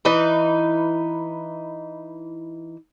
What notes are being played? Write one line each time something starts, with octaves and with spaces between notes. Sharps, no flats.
E3 D#4 B4